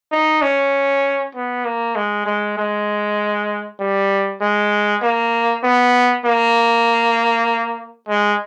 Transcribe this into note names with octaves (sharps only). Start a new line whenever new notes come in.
D#4
C#4
B3
A#3
G#3
G#3
G#3
G3
G#3
A#3
B3
A#3
G#3